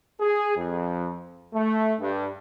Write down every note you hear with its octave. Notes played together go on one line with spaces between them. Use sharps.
G#4
F2
A3
G2